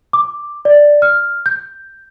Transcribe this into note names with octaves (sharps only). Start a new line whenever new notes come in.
D6
D5
F6
G6